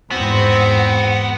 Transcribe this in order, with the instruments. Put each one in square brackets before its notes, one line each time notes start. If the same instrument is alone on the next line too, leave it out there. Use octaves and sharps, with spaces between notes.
[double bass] E2 G#2 [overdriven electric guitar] B3 [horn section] C4 [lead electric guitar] F#4